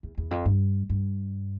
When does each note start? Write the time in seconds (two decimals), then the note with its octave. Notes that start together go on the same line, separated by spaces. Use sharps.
0.03 E2
0.18 E2
0.31 F2
0.45 G2
0.89 G2